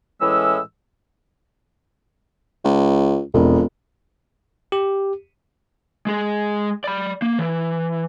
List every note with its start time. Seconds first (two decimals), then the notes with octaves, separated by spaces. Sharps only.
0.21 A2 E3 G#3 C#4 E6
2.64 C#2
3.34 E1 F2
4.72 G4
6.07 G#3 G#4
6.84 D5 B5
7.22 A#3
7.39 E3